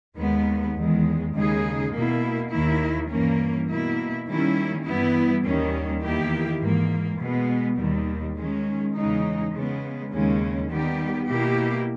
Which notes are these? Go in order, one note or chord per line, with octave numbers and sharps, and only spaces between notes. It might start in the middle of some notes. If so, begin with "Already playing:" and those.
D#2 D#3 G#3 B3
E2 D#3 G#3
D#2 C#3 G#3 D#4 G#4
B2 A#3 E4
D#2 D#3 A#3 E4
G2 E3 A#3 C#4
B2 A#3 E4
D#3 G3 A#3 C#4 E4
G2 E3 G3 B3 E4
D#2 D#3 G3 C#4
E2 D#3 A#3 E4 G4
G#2 E3 A#3
B2 G#3 B3
D#2 D#3 G3
D#3 G#3 C#4
E2 C#3 G#3 D#4
C#3 G#3 B3
D#2 C#3 G#3 C#4
D#3 G3 B3 G4
B2 A#3 E4 G4